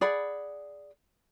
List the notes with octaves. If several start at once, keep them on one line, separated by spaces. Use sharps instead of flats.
G#4 D5 F#5 B5